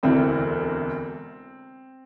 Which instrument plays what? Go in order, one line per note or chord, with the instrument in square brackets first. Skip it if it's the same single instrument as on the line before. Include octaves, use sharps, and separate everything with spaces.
[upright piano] E1 D2 C3 E3 C4